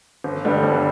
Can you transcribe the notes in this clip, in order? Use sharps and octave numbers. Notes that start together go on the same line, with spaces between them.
G1
G2 D3 G3 B3
G1